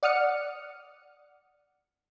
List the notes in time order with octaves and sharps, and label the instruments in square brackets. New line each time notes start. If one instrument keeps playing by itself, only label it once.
[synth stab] D5 F#5 D#6 F6 C#7